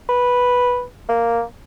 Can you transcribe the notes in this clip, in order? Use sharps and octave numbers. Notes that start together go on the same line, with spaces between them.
B4
A#3